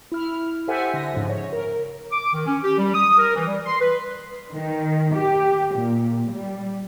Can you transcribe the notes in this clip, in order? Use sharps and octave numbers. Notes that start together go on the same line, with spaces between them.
E4 F6
G4 A4 C5 E5 F#5 G#5
D3 E5 A#6
G#2 C#3 F3
C#5
A#4
D6
D#3
C#4
G4
G3
D#6
A#4
E3
G3
C6
B4
D#3
G4
A#2
G3